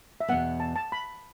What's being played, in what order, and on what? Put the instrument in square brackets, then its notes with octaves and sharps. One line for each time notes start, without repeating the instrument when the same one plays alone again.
[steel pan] E5
[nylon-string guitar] E2 B2 B3 [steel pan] F#5
[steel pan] A5
A5
B5